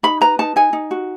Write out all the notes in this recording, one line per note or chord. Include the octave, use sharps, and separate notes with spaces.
D#4 B5
B4 A#5
D#4 A5
D#4 G#5
D#4
F#4